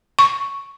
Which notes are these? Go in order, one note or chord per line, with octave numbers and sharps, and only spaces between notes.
C#6